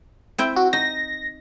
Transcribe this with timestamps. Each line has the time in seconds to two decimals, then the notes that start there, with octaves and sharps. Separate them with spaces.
0.38 C4 E4 G5
0.56 F#4
0.73 D#4 A#6